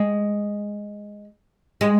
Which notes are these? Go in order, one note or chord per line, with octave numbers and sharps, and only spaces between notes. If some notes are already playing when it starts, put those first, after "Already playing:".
Already playing: G#3
G#3